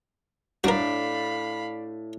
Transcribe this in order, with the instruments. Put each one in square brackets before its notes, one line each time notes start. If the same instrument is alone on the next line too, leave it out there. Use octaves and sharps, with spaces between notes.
[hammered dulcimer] A2 [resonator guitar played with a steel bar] D4 [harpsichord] F#4 A#4 [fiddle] F5 B5